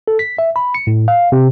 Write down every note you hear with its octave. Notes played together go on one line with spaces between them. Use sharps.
A4
B6
E5
B5
C#7
A2
F5
C3